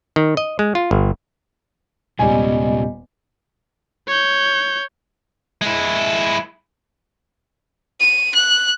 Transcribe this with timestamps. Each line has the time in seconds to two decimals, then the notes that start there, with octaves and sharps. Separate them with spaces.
0.16 D#3
0.37 D#5
0.59 G#3
0.75 F4
0.91 G1
2.19 D#1 C3 G3 G#3 B3 C#4 D#5 G#5
4.08 C#5 G6
5.62 G#3 E4
8.00 D#7
8.35 F#6